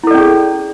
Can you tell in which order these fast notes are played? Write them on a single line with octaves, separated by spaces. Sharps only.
E4 A4 D5 C#4 G#4